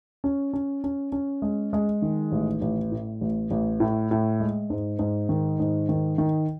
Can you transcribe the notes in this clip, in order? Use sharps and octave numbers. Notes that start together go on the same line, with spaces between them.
C#4
C#4
C#4
C#4
G#3
G#3
D#3
A1
A1
A2
A1
A1
A2
A2
G#3
G#2
G#2
D#3
G#2
D#3
D#3